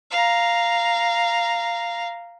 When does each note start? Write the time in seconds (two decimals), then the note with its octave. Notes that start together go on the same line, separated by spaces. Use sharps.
0.11 F5 A#5